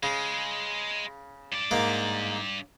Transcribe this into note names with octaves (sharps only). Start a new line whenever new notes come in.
C#3 G#3
G2 D5
G#2 A#3